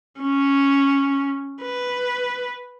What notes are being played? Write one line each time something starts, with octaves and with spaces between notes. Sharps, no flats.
C#4
B4